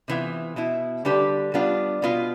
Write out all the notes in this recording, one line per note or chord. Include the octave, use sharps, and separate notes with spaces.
C3 E3 B3 F4
B2 B3 E4
D3 G3 D4 G4 B4
G3 B3 D4 F4
B2 B3 F4